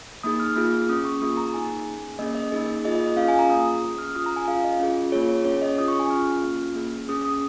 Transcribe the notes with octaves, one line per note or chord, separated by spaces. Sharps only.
A#3 D#4 G#4 D#6
F6
A#3 F4 G#4
C#4 G#4 D#6
C#6
A#3 F4 G#4 D#6
A#5
A#3 D#4 G#4 G#5
C#4 G#4
A#3 C#4 G#4 D#5
D#5
A#3 D#4 G#4
A#3 F4 G#4 D#5
D#5
D#5
C#4 F4 G#4 F5
G#5
A#5
A#3 F4 G#4 D#6
D#6
C#4 G#4 D#6
F6
C#4 F4 G#4 D#6
A#5
G#5
C#4 F4 G#4 F5
D#5
C#4 F4 G#4
A#3 F4 G#4 C#5
C#5
C#4 G#4 C#5
D#5
C#4 F4 G#4 D#6
C#6
G#5
C#4 F4 G#4 F6
A#3 C#4 F4
A#3 C#4 G#4
C#4 G#4 D#6
D#6